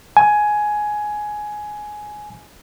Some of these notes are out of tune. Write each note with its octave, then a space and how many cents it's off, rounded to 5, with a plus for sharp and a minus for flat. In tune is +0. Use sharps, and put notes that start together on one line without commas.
G#5 +10